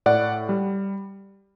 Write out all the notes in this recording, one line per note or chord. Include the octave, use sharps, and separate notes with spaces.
A2 D5 F#5
G3